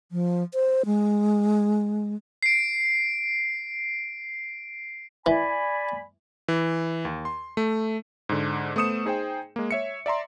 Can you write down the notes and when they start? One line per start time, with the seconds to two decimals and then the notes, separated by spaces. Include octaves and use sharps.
0.12 F3
0.54 C5
0.86 G#3
2.43 C7 D7
5.26 E3 D5 G#5 B5
6.48 E3
7.05 D#2
7.25 C6
7.57 A3
8.29 G#2 D3
8.76 A3 B3 C5 D#6 C#7 E7
9.05 D#4 G#4 C5 G5
9.56 G#3 A#3
9.71 C#5 E5 C#7
10.06 D5 E5 A#5 C6